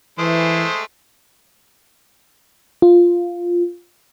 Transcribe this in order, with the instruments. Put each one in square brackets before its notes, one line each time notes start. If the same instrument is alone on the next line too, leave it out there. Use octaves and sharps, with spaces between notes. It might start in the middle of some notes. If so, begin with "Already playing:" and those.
[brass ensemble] E3 [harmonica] G#3 A3 C5
[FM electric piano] F4